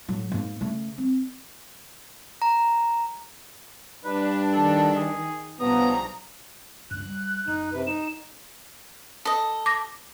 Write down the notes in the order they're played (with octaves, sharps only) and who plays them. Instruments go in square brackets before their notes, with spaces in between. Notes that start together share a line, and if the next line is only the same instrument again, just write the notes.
[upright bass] A2 F#3
G#2 A#3
C#3 A3
C4
[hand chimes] A#5
[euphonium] G2 [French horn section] D4 [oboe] B4
[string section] D#3 [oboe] A4
[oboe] G#4
[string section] B1 A#5 [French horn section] G2 C#3 F3 [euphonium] B3 [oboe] D#6
[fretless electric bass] C#2 G2 [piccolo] F#6
[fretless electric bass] G3
[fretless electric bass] F#1 [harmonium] D#4
[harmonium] C3 B4
[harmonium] D#4 [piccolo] E7
[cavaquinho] A4 D#5
[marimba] D6 A#6